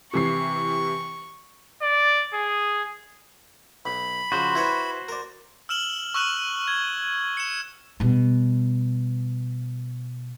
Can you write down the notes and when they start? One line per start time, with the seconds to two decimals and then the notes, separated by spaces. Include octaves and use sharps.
0.14 C3 E3 C#6 C7
1.81 D5
2.33 G#4
3.86 B1 B5
4.32 C#3 F3 F#4 C5
4.55 E4 B4 C#5
5.09 A#4 D5
5.69 E6 F6 E7 F#7 G7
6.14 C#6 E6 F#6 E7 F#7
6.68 G#6 G7
7.37 C#7 E7
8.00 B2 G3